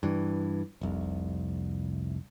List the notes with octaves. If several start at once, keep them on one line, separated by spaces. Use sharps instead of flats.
G2 E3
F1 C2